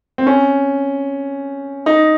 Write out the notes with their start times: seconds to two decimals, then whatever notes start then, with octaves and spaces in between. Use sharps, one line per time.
0.18 C4
0.27 C#4
1.86 D#4